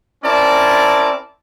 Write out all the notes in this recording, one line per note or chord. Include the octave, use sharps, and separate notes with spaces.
C4 C#4 E4 A#4 D5 A5